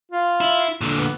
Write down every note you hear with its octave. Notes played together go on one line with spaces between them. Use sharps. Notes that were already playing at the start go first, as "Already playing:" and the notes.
F4
E4
A#2 D3
B3